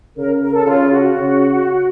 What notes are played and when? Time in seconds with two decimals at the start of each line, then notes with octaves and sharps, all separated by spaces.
0.17 C#3 A#4
0.42 A#4
0.54 A4
0.66 C#3 F4
0.91 F#4
1.16 C#3